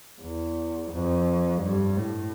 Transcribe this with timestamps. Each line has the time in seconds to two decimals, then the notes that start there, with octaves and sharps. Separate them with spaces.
0.21 E2
0.91 F2
1.62 G2
1.97 A2